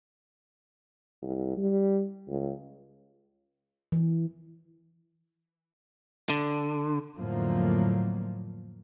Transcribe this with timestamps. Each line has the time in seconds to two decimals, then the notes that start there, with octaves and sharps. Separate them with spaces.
1.22 C2
1.57 G3
2.28 C#2
3.92 E3
6.30 D3
7.17 F2 A2 D3 F3 F#3 A#3